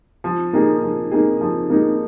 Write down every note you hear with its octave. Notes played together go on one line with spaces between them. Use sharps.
F3
A#3 D#4 G#4
F3
A#3 D#4 G#4
F3
A#3 D#4 G#4